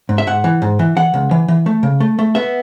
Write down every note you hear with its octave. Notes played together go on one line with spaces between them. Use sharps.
G#2
E5
G#2 F#5
E3
G#2
E3
E3 F#5
C#2
E3
E3
A3
C#3
A3
A3
B3 E5